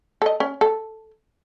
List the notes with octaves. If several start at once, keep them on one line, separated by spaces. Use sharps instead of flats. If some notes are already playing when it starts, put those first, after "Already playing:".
A4 D#5
C#4
A4